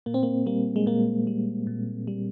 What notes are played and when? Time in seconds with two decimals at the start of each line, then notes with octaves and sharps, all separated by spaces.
0.06 A#2 A#3
0.14 C4
0.23 A#3
0.46 G3 A#3
0.76 G#3
0.86 A#2 A#3
1.27 G3
1.67 A#2
2.07 G3